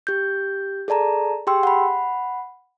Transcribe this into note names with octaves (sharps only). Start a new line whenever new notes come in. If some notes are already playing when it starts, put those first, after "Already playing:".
G4 G6
G#4 A4 D5 A5 A#5
G4 G#4 G5 C6 E6
F#5 B5